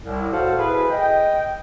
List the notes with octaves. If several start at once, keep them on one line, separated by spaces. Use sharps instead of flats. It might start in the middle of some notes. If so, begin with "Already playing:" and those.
C2 A2
F#4 A4 C5 F5
E4 G#4 B4
D#5 G5